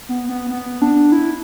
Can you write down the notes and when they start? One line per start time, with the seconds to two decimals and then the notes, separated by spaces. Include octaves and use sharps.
0.09 B3
0.29 B3
0.51 B3
0.82 D4
1.12 E4